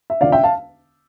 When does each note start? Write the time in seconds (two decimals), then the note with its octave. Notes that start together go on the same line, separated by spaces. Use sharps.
0.10 E5
0.21 E1 D2 D3 F3 C#4 D5 F5
0.32 E5 G5
0.43 F5 A5